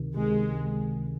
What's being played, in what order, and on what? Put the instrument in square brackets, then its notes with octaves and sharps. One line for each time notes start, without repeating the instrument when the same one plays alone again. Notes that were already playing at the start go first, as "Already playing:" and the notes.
Already playing: [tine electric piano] C#2 C3 D#3
[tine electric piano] C#2 C3 D#3 [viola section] G#3